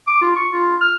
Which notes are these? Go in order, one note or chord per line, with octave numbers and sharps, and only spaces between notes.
D6
F4
C#6
F4
F6